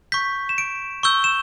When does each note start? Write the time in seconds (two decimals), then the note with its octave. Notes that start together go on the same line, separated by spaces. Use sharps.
0.12 C#6 G6 B6
0.49 E7
0.58 D7
1.03 C#6 E6 G6 G7
1.24 E7